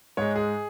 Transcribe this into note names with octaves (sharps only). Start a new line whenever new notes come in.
G#2 G#3 C#5
G#4